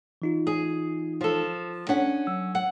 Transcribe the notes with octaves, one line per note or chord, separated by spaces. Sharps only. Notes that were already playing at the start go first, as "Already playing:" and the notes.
E3 D#4 F4
G#4
F3 A4
C#4 D4 F#5
F#3 E6
F#5